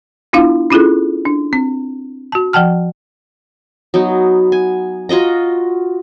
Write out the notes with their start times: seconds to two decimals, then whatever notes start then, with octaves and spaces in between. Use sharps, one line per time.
0.33 B3 D4 E4 F4 F5
0.70 C#4 E4 F4 G#4 A4
1.25 D4
1.53 C4
2.32 F#4 A5
2.53 F3 F#5 G5 A5 F6
3.94 F#3 B3 D#4
4.52 G#5
5.09 F4 F#4 D#5 A#5